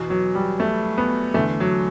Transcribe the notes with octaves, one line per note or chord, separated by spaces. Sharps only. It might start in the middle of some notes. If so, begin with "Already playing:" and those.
Already playing: E2 B2
F#3
G3
A3
B3
E2 D3 A3
F#3